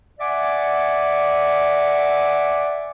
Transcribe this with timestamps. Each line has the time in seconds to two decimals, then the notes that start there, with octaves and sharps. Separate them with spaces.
0.19 D5 E5 F#5 G#5 D6